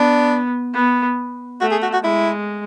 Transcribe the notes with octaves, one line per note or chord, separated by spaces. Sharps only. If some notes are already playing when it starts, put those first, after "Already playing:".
Already playing: B3 D4
B3
A3 F#4
G#4
F#4
F#4
G#3 E4